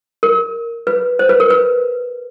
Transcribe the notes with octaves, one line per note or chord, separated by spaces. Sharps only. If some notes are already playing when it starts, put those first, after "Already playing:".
A#4
B4
C5
B4
A#4
B4